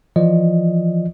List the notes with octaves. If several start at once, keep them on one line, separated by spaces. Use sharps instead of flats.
E3 F3 F4 D5 D#5